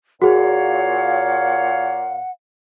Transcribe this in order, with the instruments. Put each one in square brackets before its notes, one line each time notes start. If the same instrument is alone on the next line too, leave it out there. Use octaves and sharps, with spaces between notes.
[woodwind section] A#2 C#5 F5 [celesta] F#4 G#4 [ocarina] F#5